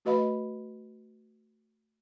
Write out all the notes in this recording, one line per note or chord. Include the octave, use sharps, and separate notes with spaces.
A3 F#4 B4 D#5 F5 B5